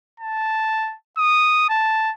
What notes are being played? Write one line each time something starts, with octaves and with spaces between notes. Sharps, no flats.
A5
D#6
A5